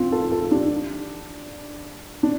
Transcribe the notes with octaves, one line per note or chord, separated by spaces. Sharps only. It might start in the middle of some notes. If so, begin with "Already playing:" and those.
Already playing: C4 F4
F4 A4
F4 A4
D4 G4
D4